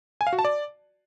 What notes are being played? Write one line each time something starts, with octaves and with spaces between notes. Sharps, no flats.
G#5
F5
F#4
A5
D5